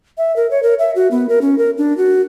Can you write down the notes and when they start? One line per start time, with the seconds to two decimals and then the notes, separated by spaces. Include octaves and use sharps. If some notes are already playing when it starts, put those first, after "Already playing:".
0.18 E5
0.36 A#4
0.51 C#5
0.63 A#4
0.79 E5
0.95 F#4
1.11 B3
1.29 A#4
1.41 C#4
1.58 A#4
1.78 D4
1.98 F#4